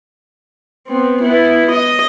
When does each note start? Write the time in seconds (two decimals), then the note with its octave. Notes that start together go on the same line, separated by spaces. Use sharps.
0.88 B3 C4
1.22 B3 E4
1.72 D#5